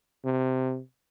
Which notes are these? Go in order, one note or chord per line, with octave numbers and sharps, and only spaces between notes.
C3